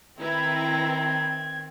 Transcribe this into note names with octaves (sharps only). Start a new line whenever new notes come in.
D#3 C4 E4 B4 A#5 G#6